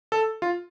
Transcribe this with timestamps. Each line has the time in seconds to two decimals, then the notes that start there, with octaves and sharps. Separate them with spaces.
0.12 A4
0.42 F4